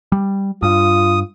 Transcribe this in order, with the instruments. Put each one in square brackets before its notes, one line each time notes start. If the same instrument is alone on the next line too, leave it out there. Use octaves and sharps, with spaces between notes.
[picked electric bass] G3
[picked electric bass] G2 [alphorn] F4 [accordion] D#6